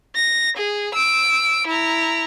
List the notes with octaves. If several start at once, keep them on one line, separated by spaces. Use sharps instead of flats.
A#6
G#4
E6 D7
E4 A#5